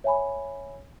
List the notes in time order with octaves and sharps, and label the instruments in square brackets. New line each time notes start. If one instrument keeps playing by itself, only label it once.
[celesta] C#5 E5 G#5 B5